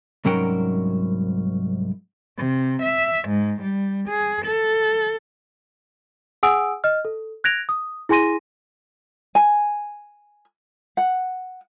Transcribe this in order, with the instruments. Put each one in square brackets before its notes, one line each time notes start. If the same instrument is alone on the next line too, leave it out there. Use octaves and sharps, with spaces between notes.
[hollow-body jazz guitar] C2 G#2 F#3 C#4 A#4 G5
[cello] C3
E5
G#2
G3
G#4
A4
[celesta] G#4 F#5 G#5 D#6 E6 D7
D#5 F6
A4
F#6 G#6 A#6 D7 F7
D#6
E4 G#4 G#5 C6 A#6 D#7
[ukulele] G#5
F#5